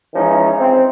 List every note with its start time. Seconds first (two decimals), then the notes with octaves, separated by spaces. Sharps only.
0.14 E3 F3 G#3 C#4 D#4 E4
0.60 C4